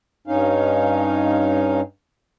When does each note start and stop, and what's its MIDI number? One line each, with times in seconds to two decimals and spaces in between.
0.27 1.81 43
0.27 1.81 61
0.27 1.81 63
0.27 1.81 77